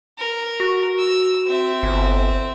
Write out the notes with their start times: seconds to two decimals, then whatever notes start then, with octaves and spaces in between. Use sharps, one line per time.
0.18 A#4
0.60 F#4
0.98 E6
1.46 C4 E5
1.83 G1